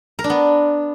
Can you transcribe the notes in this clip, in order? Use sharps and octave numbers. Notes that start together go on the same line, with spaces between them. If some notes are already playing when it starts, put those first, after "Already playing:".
A#4
D4
B3